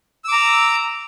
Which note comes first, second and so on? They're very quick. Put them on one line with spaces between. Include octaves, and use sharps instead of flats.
E6 D6 A#5